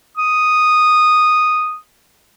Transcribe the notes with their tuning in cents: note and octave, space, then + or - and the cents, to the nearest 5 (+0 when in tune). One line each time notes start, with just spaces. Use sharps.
D#6 -5